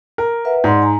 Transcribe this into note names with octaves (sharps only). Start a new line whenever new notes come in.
A#4
B4 E5 F#5
G#2 D5 F#5 C6
G#5 A#5